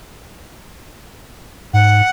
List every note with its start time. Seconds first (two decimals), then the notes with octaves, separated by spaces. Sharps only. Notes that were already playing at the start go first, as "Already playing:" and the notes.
1.73 G#2 F#5